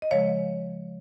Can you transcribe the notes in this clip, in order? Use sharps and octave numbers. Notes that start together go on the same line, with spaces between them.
D#5
C#3 F3 G#3 C#5 F5